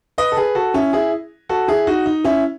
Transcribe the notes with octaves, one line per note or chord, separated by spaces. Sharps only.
B4 D#5
A4
G#4 B4
F#4 A4
C#4 E4
E4 G#4
F#4 A4
E4 G#4
D#4 F#4
D#4
C#4 E4